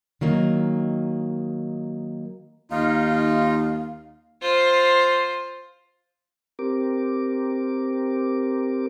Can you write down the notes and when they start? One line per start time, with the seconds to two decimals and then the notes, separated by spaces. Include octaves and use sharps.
0.21 D#3 F#3 A#3 D#4
2.71 D#2 D#4 F4 F5
4.42 F4 C5
6.59 C4 G4 A#4 D6